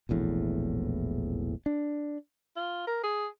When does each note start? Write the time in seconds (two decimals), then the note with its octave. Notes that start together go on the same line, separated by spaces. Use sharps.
0.09 E1 A#1 E2 A2
1.66 D4
2.56 F4
2.87 A#4
3.03 G#4